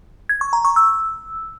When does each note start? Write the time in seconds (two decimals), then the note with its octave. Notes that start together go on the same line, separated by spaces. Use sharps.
0.29 G#6
0.41 C#6
0.53 A#5
0.65 C#6
0.76 E6